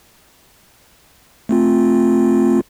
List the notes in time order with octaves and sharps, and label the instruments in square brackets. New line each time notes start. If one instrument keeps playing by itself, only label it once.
[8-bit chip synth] A3 C4 F4